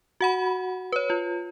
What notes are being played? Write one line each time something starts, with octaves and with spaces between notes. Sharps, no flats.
F#4 F#5 B5
B4 C#5
F4